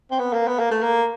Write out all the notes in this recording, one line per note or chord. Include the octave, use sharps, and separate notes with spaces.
C4
B3
A#3
B3
A#3
A3
A#3